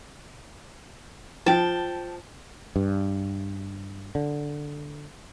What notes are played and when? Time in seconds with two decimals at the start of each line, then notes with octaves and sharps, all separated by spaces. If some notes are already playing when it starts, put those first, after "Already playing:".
1.46 F3 G5 A5
2.76 G2
4.15 D3